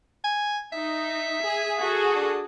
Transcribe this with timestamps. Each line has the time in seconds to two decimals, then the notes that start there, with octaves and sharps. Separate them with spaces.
0.24 G#5
0.73 D#4 E5
1.43 G#4 G#5
1.79 F#4 G#4 A4
2.15 D4